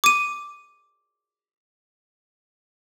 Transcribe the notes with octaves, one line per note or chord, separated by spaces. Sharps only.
D6 D#7